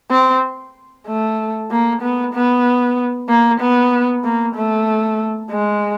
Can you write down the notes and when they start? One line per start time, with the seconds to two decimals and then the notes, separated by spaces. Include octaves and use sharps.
0.11 C4
1.07 A3
1.71 A#3
2.02 B3
2.34 B3
3.29 A#3
3.60 B3
4.24 A#3
4.56 A3
5.51 G#3